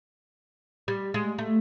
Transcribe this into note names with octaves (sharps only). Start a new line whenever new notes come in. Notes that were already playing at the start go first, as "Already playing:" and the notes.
G3
G#3
A3